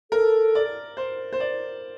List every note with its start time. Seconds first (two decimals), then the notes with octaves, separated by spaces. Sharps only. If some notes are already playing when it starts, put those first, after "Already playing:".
0.11 A4 A#4
0.55 D5
0.97 C5
1.33 C5
1.40 D5